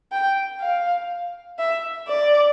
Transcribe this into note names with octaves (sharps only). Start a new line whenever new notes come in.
G5
F5
E5
D5